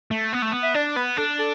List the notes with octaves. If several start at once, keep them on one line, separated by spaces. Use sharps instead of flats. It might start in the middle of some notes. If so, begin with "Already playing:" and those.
A3
B3
A3
B3
E5
D4 D5
B3 B4
D4 A4
A4